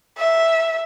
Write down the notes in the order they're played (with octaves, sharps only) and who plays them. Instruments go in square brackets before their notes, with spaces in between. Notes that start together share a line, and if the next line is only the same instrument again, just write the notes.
[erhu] E5